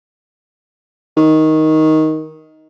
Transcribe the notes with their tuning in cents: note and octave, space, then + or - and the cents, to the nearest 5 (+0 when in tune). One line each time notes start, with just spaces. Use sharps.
D#3 +10